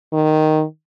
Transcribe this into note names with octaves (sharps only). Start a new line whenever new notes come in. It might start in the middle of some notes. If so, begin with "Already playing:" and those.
D#3